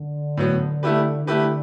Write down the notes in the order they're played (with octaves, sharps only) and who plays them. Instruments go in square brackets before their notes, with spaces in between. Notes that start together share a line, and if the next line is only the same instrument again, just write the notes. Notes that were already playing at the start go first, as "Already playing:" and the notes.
Already playing: [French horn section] D3
[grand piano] A2 F#3 B3
A3 E4 G4 B4
[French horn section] D3 [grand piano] A3 E4 G4 B4